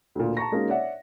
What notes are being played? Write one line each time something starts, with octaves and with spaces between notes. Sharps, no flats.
D2 A#2
A5 A#5 C#6 A#6
G#3 A#3 C#4 D#4 F#4
C#5 D5 E5 F#5